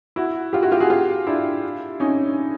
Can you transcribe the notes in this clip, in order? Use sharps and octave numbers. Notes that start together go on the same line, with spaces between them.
E4 F#4
F4 G4
E4 F#4
F4 G4
F#4 G#4
F4 G4
D4 E4
C#4 D#4